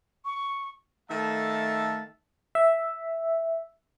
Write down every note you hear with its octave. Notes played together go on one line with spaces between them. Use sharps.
C#6
D#3 A3 A4 E5 F5 A5
E5